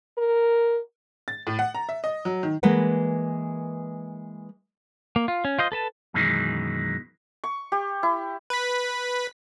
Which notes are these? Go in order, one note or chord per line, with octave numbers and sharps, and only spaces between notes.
A#4
A6
A2
F#5
A#5
E5
D#5
F#3
D#3
E3 G#3 A#3 A#4 B4 F#5
A#3
F4
C#4
F4 C5 D#5
A4 B4 A5
F#2 B2 D#3 E3 G#3
C#6
G4
E4
B4 B6